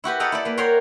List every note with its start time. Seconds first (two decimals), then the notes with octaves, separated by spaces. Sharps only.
0.04 E4 F#4 G4 B4
0.20 A4 D#5 F#5 G5 A#5
0.32 E4 A4 D5
0.45 A#3 B4
0.57 F#4 A#4 C#5 F5 G5 C6